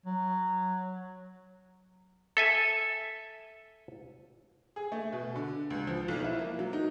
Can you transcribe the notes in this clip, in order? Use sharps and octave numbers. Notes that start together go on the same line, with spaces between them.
F#3
A4 E5 G#5
G#4
A3
B2
D3
C#2
F3
B1
E4
A#3
F#3
D#4